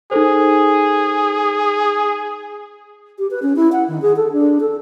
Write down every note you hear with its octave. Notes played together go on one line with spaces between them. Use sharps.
D#4 G#4 A4 C5
G4
B4
C#4
E4
F#5
D#3
G#4
A4
D4
A4